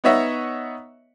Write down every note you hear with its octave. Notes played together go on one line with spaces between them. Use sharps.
B3 D#4 C#5 D#5 E5 F#5